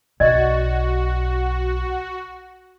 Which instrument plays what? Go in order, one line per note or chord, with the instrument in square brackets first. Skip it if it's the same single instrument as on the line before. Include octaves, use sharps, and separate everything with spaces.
[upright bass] B1 [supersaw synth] F#4 [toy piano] D5 D#5